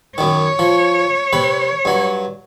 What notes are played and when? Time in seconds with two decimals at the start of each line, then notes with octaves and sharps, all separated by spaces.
0.18 F#2 D#3 C#5
0.59 F3
1.33 C3 B4
1.85 G2 F#3